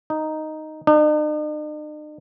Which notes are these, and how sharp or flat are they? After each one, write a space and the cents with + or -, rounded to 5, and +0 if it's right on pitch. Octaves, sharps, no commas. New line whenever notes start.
D#4 +0
D#4 -45